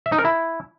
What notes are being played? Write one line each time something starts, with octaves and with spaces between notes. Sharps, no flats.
E5
D#4
A#4
E4